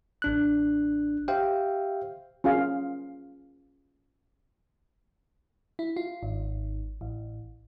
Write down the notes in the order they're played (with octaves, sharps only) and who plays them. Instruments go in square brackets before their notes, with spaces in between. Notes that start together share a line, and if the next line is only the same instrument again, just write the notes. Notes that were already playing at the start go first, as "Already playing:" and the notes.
[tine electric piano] A1 D4 F#6
G4 C5 E5 F5 G5
[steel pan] C#4 F4 G#4 F5
[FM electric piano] E4
F4
G#1
A1